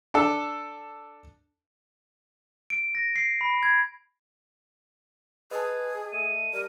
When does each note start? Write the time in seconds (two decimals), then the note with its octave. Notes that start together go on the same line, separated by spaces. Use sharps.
0.14 D4 A4
2.70 D7
2.95 A#6
3.16 C7
3.41 B5
3.63 G#6
5.51 G#4 B4 D#5 A5
6.12 A3 D#7
6.53 G3 A#4